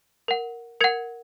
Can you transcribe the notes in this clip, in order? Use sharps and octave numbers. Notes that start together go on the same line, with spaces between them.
A#4 F#5
A#4 F#5 G#6 C#7